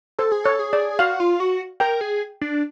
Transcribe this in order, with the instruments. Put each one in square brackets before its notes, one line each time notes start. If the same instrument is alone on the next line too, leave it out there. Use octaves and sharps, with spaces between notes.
[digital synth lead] A4 [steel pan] C5
[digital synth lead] G#4
[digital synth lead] A4 [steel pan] C#5
[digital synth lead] G#4
[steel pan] D5
[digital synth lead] F#4 [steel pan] F5
[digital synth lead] F4
F#4
[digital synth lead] A#4 [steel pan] G5
[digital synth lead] G#4
D4